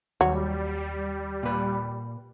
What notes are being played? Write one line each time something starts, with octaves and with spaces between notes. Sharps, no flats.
D#2 F#3 G3
A#2 B4